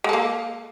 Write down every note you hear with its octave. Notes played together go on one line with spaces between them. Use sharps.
G#3 A#3 A4